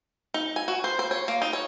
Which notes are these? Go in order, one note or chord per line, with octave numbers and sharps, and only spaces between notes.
D#4
G#5
F#4
C5
C5
C#5
A#3
D#4
C#5